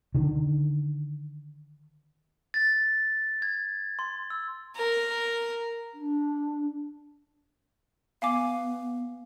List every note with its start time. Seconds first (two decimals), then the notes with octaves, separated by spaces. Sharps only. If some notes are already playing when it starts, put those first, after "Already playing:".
0.15 D3 D#3
2.54 A6
3.42 G#6
3.99 C6
4.30 E6
4.76 A#4
5.94 D4
8.22 B3 F5 G#5 D6